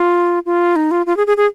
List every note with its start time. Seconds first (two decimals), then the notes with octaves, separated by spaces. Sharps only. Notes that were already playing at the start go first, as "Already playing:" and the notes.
Already playing: F4
0.46 F4
0.76 D#4
0.91 F4
1.06 F4
1.17 G#4
1.27 G#4
1.37 G#4